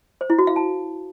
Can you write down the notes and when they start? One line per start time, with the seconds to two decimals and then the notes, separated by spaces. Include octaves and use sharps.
0.21 C5
0.30 E4
0.38 F#4
0.47 F5
0.56 A5